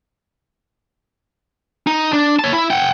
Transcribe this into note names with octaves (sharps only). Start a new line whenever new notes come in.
D#4
D4
C#5 A5
E4
F#5 G5